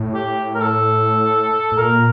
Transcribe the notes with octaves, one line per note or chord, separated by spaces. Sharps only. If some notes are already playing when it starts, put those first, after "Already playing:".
Already playing: A2
G4
A#4
A4
A2
A#2 A#4